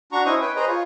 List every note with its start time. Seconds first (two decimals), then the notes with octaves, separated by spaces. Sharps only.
0.12 D4 F#4 A#5 C#6
0.26 C#4 E4 C5 D#5 C#6 D#6
0.41 B4 C#5 G5
0.56 G#4 B4 C5 D#5 A#5
0.68 F4 C#5